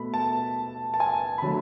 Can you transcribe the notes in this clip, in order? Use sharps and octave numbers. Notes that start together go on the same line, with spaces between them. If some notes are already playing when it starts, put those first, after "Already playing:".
Already playing: B2 A3 B5
A5
A5
G#5
B5
D3 F#3 A3 A5